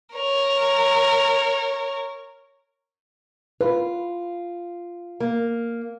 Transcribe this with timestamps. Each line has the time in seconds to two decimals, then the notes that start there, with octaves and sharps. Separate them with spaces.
0.15 A#4 C#5
3.61 F4 B4
5.20 A#3